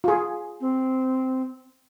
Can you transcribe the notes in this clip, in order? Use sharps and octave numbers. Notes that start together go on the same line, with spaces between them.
F4 G#4
C4